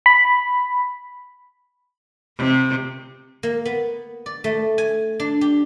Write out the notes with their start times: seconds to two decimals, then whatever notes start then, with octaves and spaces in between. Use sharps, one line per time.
0.06 B5
2.37 C3
3.43 A#3
3.65 B3
4.26 D5
4.44 A3
4.78 G#5
5.20 D4
5.41 G4